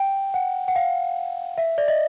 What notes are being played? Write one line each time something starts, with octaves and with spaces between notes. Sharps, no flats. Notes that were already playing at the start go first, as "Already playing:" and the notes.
Already playing: G5
F#5
F#5
F5
E5
D5
D#5